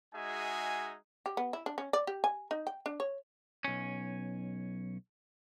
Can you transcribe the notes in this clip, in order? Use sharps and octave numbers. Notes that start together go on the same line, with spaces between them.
G#3 D#4 F#4 G#4 E5 G#5
G4
B3
E4
D4
C#4
D5
G4
G#5
D#4
G5
D4
C#5
B1 C#4